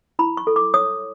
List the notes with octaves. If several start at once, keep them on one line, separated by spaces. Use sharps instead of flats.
E4 B5
C#6
A4
D6
C#5 D#6